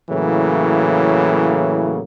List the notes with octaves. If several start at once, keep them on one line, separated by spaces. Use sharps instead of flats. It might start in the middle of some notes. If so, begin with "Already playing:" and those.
A2 C#3 E3 F#3 A#3